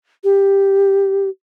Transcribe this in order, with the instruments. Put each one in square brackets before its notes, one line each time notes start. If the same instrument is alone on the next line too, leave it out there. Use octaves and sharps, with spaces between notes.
[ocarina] G4